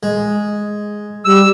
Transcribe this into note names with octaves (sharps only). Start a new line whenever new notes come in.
G#3
G3 E6